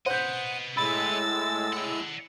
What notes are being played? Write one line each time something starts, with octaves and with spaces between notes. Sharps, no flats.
B4 C5 D#5 F#5 G6
A2 G#3 B5 E6 A6
D5 F#5